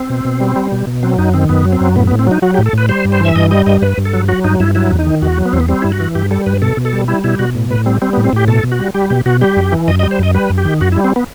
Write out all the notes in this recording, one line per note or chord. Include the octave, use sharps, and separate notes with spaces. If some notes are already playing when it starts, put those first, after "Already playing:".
Already playing: C4
B2
B2
G3
G3
B2
B2
F#3 C4
F#2 D#4
D#3 C4
F#2 B3
F#3
C4
F#2
A2 B3
B3
A2
C4
F#3 D#4
F#3 F#4
G4
A2
A4
A2 B4
G3 C5
G2
C5
E3 E5
G2 D#5
G3 D#5
G2 D#5
G2 B4
G2
A4
F#3
F#3 F#4
G2 D#4
G2 E4
F#3 E4
E2
D#4
D#3
E2 F#4
F#3
B3
E2 C4
B3
G3 C4
G2 E4
F#4
E3
G2 G4
G3 A4
G2 B4
B2 A4
B2
A4
G3
G3 E4
B2 E4
B2 F#4
A2
A2 B4
G3 C4
G3 C4
B3
A2
C4
A2 G4
B2 A4
B2
F#4
G3
G3 G4
B2 G4
B2 F#4
G3 G4
F#2
E3
F#2 D#5
D#5
G3
C5
F#2 D#5
G3 B4
F#2
G4
D#3
F#2 F#4
E4
G3
C4
B3